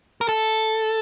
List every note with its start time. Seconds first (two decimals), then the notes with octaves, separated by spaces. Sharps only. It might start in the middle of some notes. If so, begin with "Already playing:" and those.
0.21 A#4
0.29 A4